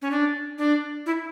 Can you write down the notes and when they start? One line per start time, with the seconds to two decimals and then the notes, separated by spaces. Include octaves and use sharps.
0.02 C#4
0.11 D4
0.58 D4
1.06 E4